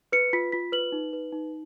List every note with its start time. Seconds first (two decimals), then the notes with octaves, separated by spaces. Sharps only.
0.12 B4 C#7
0.33 F4 B6
0.52 F4 B6
0.72 B4 F#7
0.92 D#4
1.13 B4
1.32 D#4